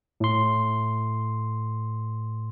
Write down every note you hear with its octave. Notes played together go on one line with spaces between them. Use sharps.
A2 C6